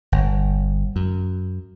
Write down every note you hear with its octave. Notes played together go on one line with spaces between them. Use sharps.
G1
F#2